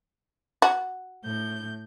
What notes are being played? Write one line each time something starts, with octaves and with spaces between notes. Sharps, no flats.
F#4
A2 G6